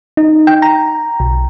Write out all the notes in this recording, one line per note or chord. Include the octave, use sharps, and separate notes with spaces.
D#4
G5
A#5
B1